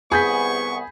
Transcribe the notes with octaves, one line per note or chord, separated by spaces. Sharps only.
C2 B3 G#4 B5 C#6 G6 B6